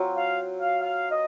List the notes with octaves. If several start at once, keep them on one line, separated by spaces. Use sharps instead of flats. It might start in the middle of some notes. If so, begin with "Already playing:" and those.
Already playing: F#3 C4 F4
F5
F5
F5
D#5